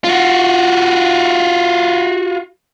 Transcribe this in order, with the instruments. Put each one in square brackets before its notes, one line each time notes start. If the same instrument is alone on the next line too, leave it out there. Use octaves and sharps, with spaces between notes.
[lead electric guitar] F4 F#4